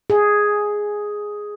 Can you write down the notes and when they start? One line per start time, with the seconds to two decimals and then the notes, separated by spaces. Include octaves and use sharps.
0.10 G#4